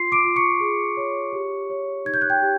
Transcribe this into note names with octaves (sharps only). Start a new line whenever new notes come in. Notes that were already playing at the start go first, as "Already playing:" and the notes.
Already playing: F4 C6 C7
D6 D7
F4
C#6 C#7
G#4
C#5
G4
C#5
D#4 G#6
G6
F#6
G5 G6
G4